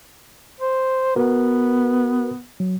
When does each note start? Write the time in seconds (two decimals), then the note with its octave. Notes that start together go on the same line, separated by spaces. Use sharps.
0.60 C5
1.16 B3 F#4 A#4 B4
2.60 F#3